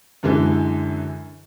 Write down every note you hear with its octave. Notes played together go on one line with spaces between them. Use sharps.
F#2 D3 E3 G#3